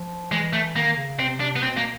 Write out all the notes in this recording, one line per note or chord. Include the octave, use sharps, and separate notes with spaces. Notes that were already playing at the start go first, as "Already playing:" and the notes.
Already playing: F3
E3 G#3
A3
D#3 A#3
C#3
C3 C4
C3 D4
B3
B2 C4
A#3